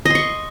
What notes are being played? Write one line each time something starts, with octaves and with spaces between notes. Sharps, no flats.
D#5 C6 C#6